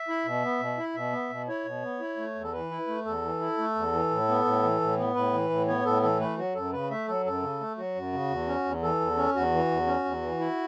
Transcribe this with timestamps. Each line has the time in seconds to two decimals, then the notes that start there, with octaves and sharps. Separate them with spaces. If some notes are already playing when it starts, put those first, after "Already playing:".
Already playing: E5
0.08 E4
0.25 B2
0.43 B3
0.61 B2
0.78 E4
0.95 B2 E5
1.13 B3
1.30 B2
1.48 E4 C#5
1.65 B2
1.82 B3
2.00 E4
2.17 A3
2.35 E2
2.43 A4
2.52 E3 B4
2.71 E4
2.87 A3
3.05 E2 A4
3.22 E3
3.40 E4
3.58 A3
3.75 E2
3.93 E3
4.10 A2
4.28 B3
4.45 A2
4.63 E3
4.81 A2
4.97 B3
5.15 A2 B4
5.33 E3
5.50 A2
5.68 B3 C#5
5.85 A2 A4
6.02 E3 A4
6.19 A3 B4
6.38 F#3 F#4
6.54 F#2 A4
6.72 C#3 B4
6.91 A3 E5
7.08 F#3 A4
7.25 F#2 A4
7.42 C#3
7.61 A3
7.77 F#3 F#4
7.95 F#2
8.13 C#3
8.30 E2
8.47 C#4
8.65 E2
8.83 E3 A4
9.00 E2
9.17 C#4
9.35 E2 F#4
9.52 E3
9.70 E2
9.87 C#4
10.05 E2
10.22 E3
10.39 E4